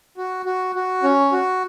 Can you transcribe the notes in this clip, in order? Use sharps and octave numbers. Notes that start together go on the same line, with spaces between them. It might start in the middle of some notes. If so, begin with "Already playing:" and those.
F#4
F#4
F#4
C#4
F#4